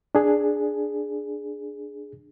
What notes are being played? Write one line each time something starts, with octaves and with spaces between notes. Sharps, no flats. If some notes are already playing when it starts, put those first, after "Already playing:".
D4 G#4